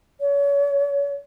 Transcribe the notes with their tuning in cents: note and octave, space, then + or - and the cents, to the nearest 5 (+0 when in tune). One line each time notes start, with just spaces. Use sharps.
C#5 +35